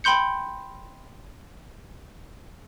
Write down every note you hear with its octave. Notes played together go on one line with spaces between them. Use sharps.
G5 B5 C6 G6 C#7